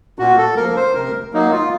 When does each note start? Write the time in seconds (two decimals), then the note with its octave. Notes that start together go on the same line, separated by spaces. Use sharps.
0.19 A#2 F#4
0.38 A4
0.56 F3 A#3 A#4
0.77 C5
0.94 C3 A#4
1.33 F#3 A#3 D#4
1.52 F4